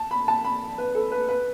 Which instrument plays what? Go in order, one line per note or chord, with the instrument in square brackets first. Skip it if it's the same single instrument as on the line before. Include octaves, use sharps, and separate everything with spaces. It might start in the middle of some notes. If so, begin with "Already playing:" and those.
Already playing: [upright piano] A5
B5
A5
B5
B4
A4
B4
B4